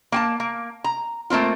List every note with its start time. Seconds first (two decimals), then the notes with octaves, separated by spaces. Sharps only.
0.12 A#3 G#5 A5
0.40 A#3
0.84 A#5
1.30 A3 A#3 C4 F4